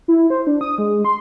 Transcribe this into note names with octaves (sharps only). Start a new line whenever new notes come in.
E4
C5
D4
D#6
G#3
C6